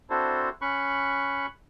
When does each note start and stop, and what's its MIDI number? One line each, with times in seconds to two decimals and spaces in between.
0.10 0.49 60
0.10 0.49 62
0.10 0.49 64
0.10 0.49 66
0.10 0.49 69
0.10 0.49 72
0.62 1.46 61
0.62 1.46 83
0.62 1.46 85
0.62 1.46 90